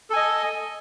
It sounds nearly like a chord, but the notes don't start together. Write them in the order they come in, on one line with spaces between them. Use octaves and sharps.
A4 G#5 D#5